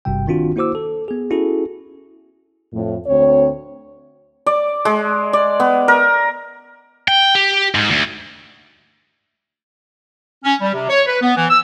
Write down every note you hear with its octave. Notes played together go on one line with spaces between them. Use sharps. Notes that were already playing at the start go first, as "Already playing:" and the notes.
G#1 G2 C3 G3 G5
D#3 C4 D4 F4 F#4
A#3 E4 F#4 C5 D6 E6
A4
B3 G#4
C#4 E4 F#4 G#4 A4
F2 A2
D2 C4 C#5
D5
G#3
D5
B3
A#4
G5
G4
G#2
D2
C#4
G3
C3
C#5
B4
B3
E3
E6